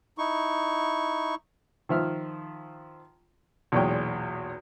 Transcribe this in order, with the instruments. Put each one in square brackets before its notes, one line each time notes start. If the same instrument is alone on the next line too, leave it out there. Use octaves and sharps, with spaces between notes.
[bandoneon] D#4 E4 C#6
[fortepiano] D#3 F3 E5 F6
B1 E2 A#2 G#3 C#5 G5